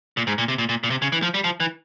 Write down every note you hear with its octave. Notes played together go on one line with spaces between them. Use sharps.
A#2
G#2
A#2
C3
A#2
A#2
A#2
C3
C#3
E3
F3
G3
F3
E3